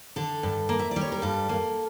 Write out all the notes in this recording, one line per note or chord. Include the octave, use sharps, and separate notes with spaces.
D3 A4
G2
A#3
E5
D5
G3
C#5
A#4
G2 A4
A#3